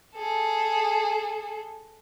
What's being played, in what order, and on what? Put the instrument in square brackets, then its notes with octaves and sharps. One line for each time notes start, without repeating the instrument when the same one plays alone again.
[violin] G#4 A4